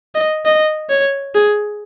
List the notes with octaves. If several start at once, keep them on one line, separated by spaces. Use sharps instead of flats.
D#5
D#5
C#5
G#4